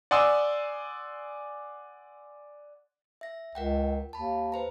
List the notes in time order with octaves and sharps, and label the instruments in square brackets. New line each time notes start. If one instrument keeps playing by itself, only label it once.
[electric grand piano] D5 F#5 G#5 C6 D#6 E6
[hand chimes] E5 A#6
[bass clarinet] C#2 [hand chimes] A#4 F#5 G5
[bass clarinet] D#2 [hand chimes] A5 B5
[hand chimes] B4 C5 A#5